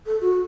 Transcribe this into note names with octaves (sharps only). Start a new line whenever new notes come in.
A4
F#4